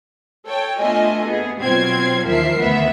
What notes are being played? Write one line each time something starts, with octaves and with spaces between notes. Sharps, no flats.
A4 C#5 G5
A3 B3 D4 F4 D#5 G#5
B3 G#4
B2 F#3 C4 F4 G#6 C7
D#2 E3 F3 A#4 E5 C7
D2 D#3 B3 E5